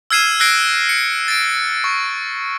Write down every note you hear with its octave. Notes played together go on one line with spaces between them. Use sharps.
E6 F6 G#6 C7 D#7 E7
E6 F#6 G#6 A#6 C7 D7
C#7
A6 D7
C#6